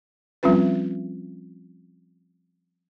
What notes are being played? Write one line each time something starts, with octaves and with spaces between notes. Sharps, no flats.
F3 G3 C4 C#4 F4 B4